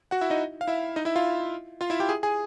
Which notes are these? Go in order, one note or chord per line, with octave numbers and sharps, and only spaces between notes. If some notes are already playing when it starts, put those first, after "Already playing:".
F#4 F#5
E4 E5
D#4 D#5
F5
E4 E5
D#4 D#5
E4 E5
F4 F5
F4 F5
E4 E5
G4 G5
G#4 G#5
G#4 G#5